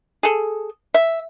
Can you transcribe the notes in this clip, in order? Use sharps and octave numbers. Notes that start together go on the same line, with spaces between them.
G#4 A4
E5